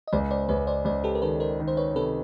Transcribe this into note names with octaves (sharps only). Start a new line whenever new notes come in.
D#5
C#2 C5 D5
C5 D5
C#2 B4 C#5
C5 D5
C#2 C5 D5
G4 A4
A#4
D#3 A4 B4
A#4 C5
D#3
C5
B4 C#5
C3 A4 B4